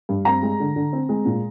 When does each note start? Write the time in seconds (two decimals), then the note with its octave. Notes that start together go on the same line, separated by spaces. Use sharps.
0.09 G2
0.25 C4 A#5
0.43 G#3
0.60 D3
0.76 D3
0.93 C4
1.09 G#3
1.25 A#2